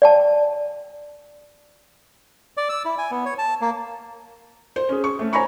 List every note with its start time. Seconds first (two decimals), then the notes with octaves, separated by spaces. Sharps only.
0.02 D5 G5 A5
2.57 D5
2.69 E6
2.85 E4
2.98 G#5
3.11 B3
3.25 C#5
3.39 A5
3.61 A#3
4.76 C5
4.89 C#4 G#4
5.04 C#6
5.19 A3 C#4
5.33 C5 C#5 G#5 A#5 B5 C#6